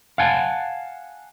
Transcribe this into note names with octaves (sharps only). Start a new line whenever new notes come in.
F5 F#5 G#5 A5